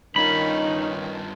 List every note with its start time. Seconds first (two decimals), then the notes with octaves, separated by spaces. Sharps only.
0.16 G2 D#3 C#4 D#4 F4 B5